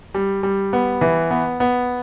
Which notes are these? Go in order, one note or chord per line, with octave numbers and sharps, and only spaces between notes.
G3
G3
B3
E3
B3
B3